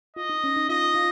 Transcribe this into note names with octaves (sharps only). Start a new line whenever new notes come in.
F4 D#5
D#4
C#4
D#4
F4 D#5
F4